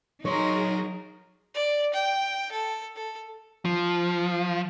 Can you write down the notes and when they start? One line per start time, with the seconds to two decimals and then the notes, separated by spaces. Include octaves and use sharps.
0.25 F#3 D#4 F#4 G#4 A#4 C#5 C6
1.54 D5
1.93 G5
2.51 A4
2.96 A4
3.65 F3